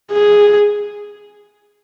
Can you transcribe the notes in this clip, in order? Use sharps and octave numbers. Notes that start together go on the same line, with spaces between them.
G#4